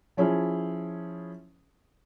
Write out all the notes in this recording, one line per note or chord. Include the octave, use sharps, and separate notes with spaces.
F3 C#4 E4 G#4